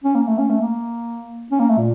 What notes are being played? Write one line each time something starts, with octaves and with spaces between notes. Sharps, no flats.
C#4
A#3
A3
C#4
A3
A#3
C#4
A#3
A3
A#2